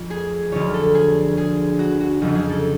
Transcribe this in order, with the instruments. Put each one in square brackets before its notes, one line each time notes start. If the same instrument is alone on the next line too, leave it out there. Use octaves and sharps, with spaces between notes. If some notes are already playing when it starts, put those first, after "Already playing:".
Already playing: [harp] F1 F2 F3
G#4
D2 D3 F3 C#5
A4
G#4
G#4
F#4
F#4
F1 F2 C#3 F3 F#4
G#4
A4